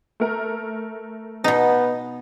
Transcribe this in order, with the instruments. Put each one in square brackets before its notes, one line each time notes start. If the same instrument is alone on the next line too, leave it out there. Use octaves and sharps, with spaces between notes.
[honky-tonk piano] A3 A#4
[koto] B2 D#4 [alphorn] B3